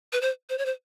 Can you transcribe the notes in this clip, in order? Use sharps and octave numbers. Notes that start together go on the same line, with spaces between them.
B4
C5
C5
C#5
C5